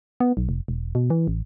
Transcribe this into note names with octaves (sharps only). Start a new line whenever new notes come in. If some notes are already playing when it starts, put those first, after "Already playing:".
B3
B1
F1
E1
B2
E3
A1